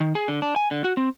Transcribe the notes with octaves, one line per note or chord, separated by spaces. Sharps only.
D#3
G#4
D3
D4
G#5
D3
F#4
C4